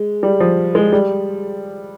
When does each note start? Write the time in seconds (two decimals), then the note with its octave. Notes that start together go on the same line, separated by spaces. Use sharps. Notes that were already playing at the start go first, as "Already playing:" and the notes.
Already playing: G#3
0.23 G3
0.40 F3
0.75 G#3
0.92 G3